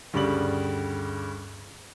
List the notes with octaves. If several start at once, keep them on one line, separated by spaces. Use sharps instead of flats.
D2 G2 C#3 G4 D5 F#7